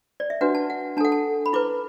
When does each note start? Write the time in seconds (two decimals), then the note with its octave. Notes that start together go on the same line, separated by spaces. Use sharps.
0.20 D5
0.30 E5
0.41 D4 F#4 B4 F#5
0.55 A5
0.70 F#5
0.97 D4 A5
1.01 A4 F#5
1.12 A5
1.46 B5
1.53 E4 B4 D6